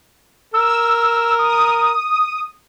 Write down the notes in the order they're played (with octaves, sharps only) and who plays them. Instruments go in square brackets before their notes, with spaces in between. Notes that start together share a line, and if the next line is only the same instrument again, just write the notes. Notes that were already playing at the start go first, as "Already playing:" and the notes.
[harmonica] A#4 [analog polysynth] E6
[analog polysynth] D#6